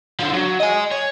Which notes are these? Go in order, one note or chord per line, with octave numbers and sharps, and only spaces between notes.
D3 F3
F#3
D#5 G#5
C#5